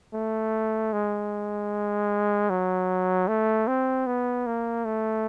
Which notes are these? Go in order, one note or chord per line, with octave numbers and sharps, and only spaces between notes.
A3
G#3
F#3
A3
C4
B3
A#3
A3